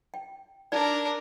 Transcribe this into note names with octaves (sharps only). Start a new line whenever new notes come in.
G5
D4 D#4 A#4 D5